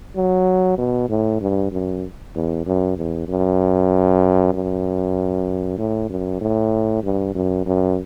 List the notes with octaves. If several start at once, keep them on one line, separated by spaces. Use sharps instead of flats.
F#3
B2
A2
G2
F#2
E2
F#2
E2
F#2
F#2
A2
F#2
A2
G2
F#2
F#2